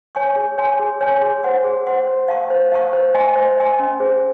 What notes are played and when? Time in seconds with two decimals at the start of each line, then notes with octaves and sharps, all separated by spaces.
0.15 C#5 G#5 C#6
0.36 G#4
0.58 C#5 G#5 C6
0.79 G#4
1.01 C#5 G#5 C6
1.22 G#4
1.43 C5 F#5 C6
1.64 G#4
1.87 C5 F#5 C6
2.07 C5
2.28 F5 A#5 C#6
2.50 C5
2.72 F5 A#5 C#6
2.93 C5
3.14 D#5 G#5 C6
3.36 C5
3.57 D#5 G#5 C6
3.79 C#4
4.00 G#4 C5